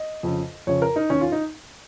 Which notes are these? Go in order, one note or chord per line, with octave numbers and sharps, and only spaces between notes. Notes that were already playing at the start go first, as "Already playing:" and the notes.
Already playing: D#5
F2 C#3
F2 C#3 C#5
A#4
D#4
D#2 D#3 C#4
F4
D#4